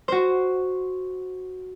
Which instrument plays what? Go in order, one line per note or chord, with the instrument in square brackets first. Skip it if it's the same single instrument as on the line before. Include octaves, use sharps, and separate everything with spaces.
[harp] F#4 C5